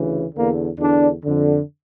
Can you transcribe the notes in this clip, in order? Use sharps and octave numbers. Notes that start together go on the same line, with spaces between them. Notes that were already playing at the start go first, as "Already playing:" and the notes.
Already playing: D2 C#3 E3
E2 D3 A#3
E2 D3 D4
F2 D3